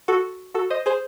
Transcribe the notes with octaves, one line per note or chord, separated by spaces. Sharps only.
F#4 A4
F#4 A4
C5 D#5
G#4 C5